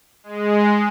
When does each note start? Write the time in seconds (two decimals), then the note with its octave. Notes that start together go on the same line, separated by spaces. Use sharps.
0.24 G#3